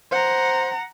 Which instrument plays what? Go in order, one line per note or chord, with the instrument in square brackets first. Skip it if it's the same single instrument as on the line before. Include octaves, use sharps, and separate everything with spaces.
[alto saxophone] C5 [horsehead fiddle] F#5 A#5